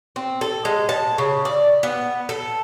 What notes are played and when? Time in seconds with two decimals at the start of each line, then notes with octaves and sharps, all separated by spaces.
0.16 C4
0.41 A4
0.65 G#3
0.89 A5
1.18 C#3
1.45 D5
1.83 B3
2.29 A4